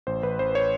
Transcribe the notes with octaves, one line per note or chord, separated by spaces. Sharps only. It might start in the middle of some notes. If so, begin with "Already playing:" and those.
A1 C5
A1 B4
A1 C5
C#5